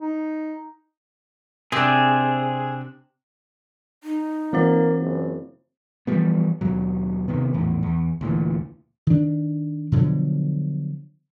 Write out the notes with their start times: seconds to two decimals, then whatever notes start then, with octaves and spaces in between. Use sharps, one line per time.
0.01 D#4
1.72 C3 C4 D4 G#4
4.04 D#4
4.53 E3 A#3 C4 F4 C5
5.00 F#1
6.07 E3 F3 G3 B3
6.61 D#2 B2 F#3
7.28 C3 D#3 B3
7.53 A#1 E2 A2
7.83 E2
8.21 D2 A#2 E3
9.07 D#3 D4
9.92 B2 D3 F3 F#3